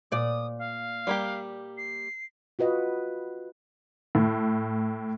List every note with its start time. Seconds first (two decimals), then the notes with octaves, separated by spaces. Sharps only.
0.12 A#2 D5 D#6
0.58 F5
1.07 G3 A#3 G4
1.78 C7
2.59 F4 F#4 B4 D#5 F#5
4.15 A2